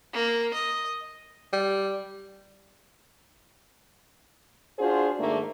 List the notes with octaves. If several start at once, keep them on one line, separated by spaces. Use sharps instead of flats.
A#3
D#5
G3
D4 F4 F#4 G#4 C5
G#2 D#3 A3 A#3 D4